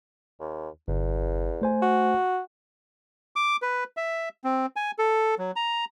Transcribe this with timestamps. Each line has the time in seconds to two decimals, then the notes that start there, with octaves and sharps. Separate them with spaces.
0.40 D#2
0.88 G1 E2
1.62 A3 C5 G#5
1.82 F#4
3.36 D6
3.62 B4
3.97 E5
4.44 C4
4.76 G#5
4.99 A4
5.39 F#3
5.56 A#5